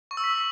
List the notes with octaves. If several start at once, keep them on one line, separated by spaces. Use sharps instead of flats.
C#6
E6
B6